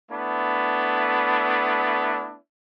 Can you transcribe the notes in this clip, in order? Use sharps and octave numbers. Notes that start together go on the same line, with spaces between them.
A3 B3 D4 E4